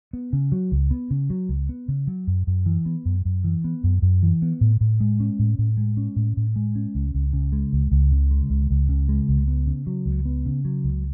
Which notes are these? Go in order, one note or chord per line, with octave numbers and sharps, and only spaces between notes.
B3
C#3
F#3
C#2
B3
C#3
F#3
C#2
B3
C#3
F#3
F#2
F#2
E3
B3
F#2
F#2
E3
B3
F#2
F#2
E3
B3
A2
A2
G#3
C#4
A2
A2
G#3
C#4
A2
A2
G#3
C#4
C#2
C#2
C#3
G#3
C#2
C#2
C#3
G#3
C#2
C#2
C#3
G#3
C#2
B3
C#3
F#3
C#2
B3
C#3
F#3
C#2